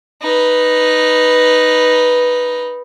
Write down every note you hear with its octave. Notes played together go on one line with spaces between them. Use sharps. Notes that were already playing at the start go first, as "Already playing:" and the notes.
D#4 B4